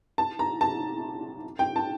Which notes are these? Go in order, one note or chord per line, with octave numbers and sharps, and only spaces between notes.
A5
A#5
A5
G5
A5